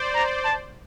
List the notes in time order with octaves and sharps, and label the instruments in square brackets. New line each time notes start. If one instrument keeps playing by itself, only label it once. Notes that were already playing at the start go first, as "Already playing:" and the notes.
Already playing: [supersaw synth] C5 D5
[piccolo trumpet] A#5
A5